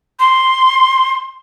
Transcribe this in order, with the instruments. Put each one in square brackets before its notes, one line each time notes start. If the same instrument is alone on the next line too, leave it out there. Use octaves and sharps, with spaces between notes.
[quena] C6